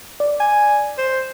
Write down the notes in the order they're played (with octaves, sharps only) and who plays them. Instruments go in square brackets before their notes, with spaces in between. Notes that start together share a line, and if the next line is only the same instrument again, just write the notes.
[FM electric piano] D5
[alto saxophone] G#5
C5